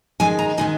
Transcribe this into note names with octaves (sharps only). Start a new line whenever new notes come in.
D#3 G#3 D#4 G#5
A#5
D#3 G#3 D#4 G#5